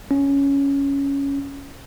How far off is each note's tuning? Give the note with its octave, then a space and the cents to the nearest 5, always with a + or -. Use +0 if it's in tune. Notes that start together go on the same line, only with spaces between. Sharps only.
C#4 +5